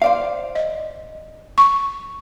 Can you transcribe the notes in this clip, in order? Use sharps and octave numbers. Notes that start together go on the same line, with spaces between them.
C5 D5 F5
D#5
C#6